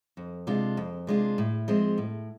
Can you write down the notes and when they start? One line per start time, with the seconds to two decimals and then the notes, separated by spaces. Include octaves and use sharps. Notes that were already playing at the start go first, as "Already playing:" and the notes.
0.17 F2
0.47 C3 G#3 D4 F4
0.77 F2
1.07 C3 G#3 D4 F4
1.38 A2
1.68 F3 G#3 C4
1.98 A2